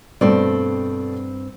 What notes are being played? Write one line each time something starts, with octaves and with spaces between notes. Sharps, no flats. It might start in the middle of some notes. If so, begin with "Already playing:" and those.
G2 B2 A3 C4 D5